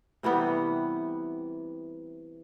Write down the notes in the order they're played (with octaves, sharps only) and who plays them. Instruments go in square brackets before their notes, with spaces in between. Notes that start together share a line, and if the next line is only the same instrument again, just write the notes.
[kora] C3 E3 G3 B3